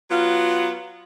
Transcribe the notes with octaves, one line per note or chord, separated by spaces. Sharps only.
F#3 B3 F4